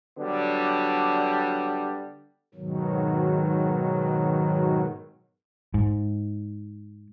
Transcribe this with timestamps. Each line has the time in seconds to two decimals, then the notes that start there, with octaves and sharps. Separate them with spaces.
0.18 D3 F#3 G3 B3 D4
2.55 G#2 B2 D#3 F#3
5.74 G#2